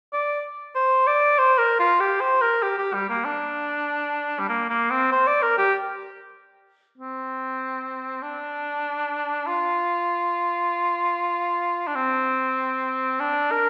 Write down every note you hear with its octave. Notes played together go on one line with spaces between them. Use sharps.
D5
C5
D5
C5
A#4
F4
G4
C5
A#4
G4
G4
G3
A#3
D4
G3
A#3
A#3
C4
C5
D5
A#4
G4
C4
D4
F4
D4
C4
D4
A#4